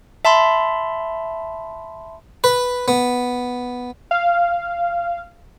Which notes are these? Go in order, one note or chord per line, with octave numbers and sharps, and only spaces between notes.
E5 A5 B5 C6
B4
B3
F5